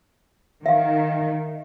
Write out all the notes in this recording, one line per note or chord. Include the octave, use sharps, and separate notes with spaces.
D#3 E5 F5